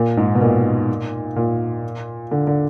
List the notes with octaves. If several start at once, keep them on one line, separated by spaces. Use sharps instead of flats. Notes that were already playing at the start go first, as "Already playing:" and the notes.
Already playing: A#2
G#2
B2
A#2
A#2
D3
D3